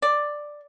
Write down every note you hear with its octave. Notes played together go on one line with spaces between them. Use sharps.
D5